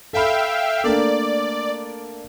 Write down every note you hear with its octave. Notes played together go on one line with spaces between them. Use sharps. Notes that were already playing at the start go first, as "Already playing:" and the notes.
A4 E5 F5 G5 B5
A3 A#3 D4 D5